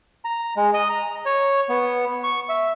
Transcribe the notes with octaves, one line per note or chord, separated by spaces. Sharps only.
A#5
G#3
D#5
A#5
C#5
B3
C#6
E5